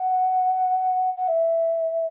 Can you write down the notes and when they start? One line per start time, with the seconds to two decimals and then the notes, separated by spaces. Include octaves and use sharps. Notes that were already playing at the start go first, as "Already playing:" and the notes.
Already playing: F#5
1.17 F#5
1.28 E5